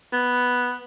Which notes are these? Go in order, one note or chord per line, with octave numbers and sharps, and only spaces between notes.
B3